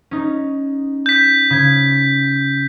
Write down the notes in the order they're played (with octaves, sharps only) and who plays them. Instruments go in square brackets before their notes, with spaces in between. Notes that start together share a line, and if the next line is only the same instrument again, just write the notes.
[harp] C#4 D#4
[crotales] G6 B6
[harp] C#3 G#6